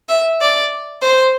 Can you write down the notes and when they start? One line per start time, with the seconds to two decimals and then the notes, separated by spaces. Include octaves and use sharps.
0.09 E5
0.41 D5
1.02 C5